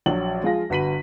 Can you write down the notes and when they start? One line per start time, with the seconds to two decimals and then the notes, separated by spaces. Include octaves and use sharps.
0.06 A#1 F#3 F#7
0.42 F3 G#3 F4 A#6
0.70 G1 F#4 B4 B6 D#7 F#7